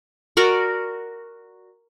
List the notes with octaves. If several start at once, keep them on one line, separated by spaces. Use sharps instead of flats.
F#4 A#4 D5